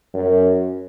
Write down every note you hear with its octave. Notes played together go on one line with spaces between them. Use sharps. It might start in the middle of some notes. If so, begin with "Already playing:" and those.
F#2